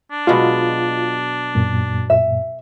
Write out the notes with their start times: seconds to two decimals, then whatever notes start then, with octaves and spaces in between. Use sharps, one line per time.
0.11 D4
0.27 B2 F#3 G#3 F4
1.55 F#2 A#2
2.10 E5